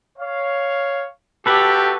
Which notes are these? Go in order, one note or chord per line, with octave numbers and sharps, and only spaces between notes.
C#5 F5
A3 F#4 G4 A4 B4